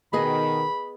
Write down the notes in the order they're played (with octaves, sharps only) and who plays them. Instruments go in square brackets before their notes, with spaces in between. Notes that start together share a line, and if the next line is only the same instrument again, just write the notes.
[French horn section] B2 D#3 [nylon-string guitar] B3 G#4 D#5 [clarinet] B5